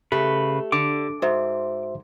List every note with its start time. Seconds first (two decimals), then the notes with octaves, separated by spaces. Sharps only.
0.12 C#3 A3 G4 B4
0.72 D3 D6
1.22 G#2 F#4 C5 E5